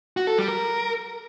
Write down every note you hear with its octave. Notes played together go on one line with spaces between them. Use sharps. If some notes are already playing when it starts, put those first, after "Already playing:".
F#4
A4
G3
A#4